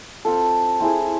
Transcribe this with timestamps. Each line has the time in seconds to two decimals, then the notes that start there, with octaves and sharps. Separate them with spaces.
0.25 C4 F4 A4
0.80 C4 E4 G#4